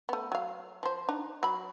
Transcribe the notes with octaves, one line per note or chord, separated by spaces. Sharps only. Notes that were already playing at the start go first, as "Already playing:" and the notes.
A3 B3
F#3 F5
F3 C5
D4 D#4
F#3 B5